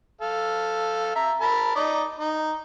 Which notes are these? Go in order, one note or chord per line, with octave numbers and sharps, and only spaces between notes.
A4 F5
E5 A#5
A#4 A5 B5
D#4 D5 D#5
D#4